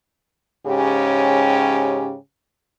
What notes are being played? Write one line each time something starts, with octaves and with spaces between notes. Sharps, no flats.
G#2 C#3 C#4 G4